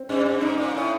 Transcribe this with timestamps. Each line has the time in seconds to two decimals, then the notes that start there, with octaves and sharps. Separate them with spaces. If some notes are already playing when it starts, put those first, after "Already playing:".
Already playing: C4
0.09 G2 C#4
0.26 G2
0.41 G#2 D#4
0.58 A#2
0.75 A2